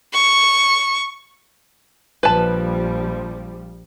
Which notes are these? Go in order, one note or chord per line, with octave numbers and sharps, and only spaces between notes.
C#6
A#1 F3 G3 B4 A5